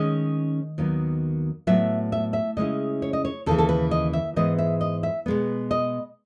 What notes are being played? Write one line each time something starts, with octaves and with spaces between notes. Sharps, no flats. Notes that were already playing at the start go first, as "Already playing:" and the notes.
Already playing: D#3 G#3 C#4 D#5
D#2 D#3 F#3 B3
A2 F#3 B3 E5
E5
E5
C#3 G#3 C#4 E4 D#5
C#5
D#5
C#5
D#2 C#3 E3 A4
A4
B4
D#5
E5
G#2 E3 G#3 B3 D#5
E5
D#5
E5
B2 G#3 B3
D#5